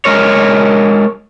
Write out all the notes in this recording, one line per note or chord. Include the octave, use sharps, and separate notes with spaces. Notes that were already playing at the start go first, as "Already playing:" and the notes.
G#3 A#4 C#5